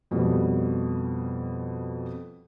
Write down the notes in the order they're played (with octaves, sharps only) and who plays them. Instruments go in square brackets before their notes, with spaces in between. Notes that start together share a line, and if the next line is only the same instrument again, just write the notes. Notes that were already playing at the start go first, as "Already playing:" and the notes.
[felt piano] F2 B2 G3